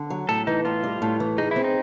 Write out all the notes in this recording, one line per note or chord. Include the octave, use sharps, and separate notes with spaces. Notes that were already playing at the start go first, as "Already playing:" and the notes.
Already playing: D3
F#3
A2 A4
E3 D#4
A2 F4
G3
A2
E3
D#4 G#4
C4 E4
D#4